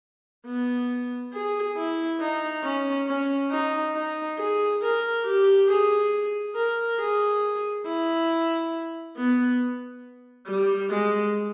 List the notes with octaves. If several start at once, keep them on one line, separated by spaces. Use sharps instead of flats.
B3
G#4
E4
D#4
C#4
C#4
D#4
D#4
G#4
A#4
G4
G#4
A#4
G#4
E4
B3
G3
G#3